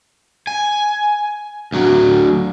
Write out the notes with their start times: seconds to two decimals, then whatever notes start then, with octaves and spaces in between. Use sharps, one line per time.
0.47 G#5
1.72 D2 F#3